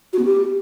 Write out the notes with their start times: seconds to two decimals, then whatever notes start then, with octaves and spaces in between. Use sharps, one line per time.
0.13 F#4
0.19 B3
0.25 G4